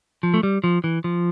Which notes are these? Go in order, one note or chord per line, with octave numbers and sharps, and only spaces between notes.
F3
A3
G3
F3
E3
F3